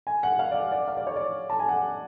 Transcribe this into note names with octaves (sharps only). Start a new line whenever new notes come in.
G#5
F#5
F5
D5
F5
D5
F5
D5
C#5
D5
A5
G#5
F#5